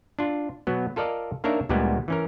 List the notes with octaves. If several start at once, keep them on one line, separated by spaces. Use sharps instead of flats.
D4 F4
B2 F#3 B3
F4 A4 A#4 D5 D#5 F5
A#3 D4 D#4 A#4 C#5 E5
D2 A#2 G3 G#3 B3
E3 C#4 A#4